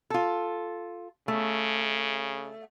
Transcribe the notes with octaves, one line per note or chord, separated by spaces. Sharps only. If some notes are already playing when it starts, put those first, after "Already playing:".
F4 A4
C#3 A3